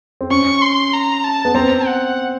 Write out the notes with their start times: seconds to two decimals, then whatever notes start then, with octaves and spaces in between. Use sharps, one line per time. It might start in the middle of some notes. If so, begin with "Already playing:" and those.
0.21 C4
0.31 C#4 C#6
0.62 C6
0.93 A#5
1.24 A5
1.45 B3
1.55 C4 A#5
1.86 F#5